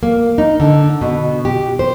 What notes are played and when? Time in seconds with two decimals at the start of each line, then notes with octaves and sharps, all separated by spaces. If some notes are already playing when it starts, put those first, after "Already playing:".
0.03 A#3
0.38 D#4
0.60 D3
1.01 B2
1.45 G4
1.79 C5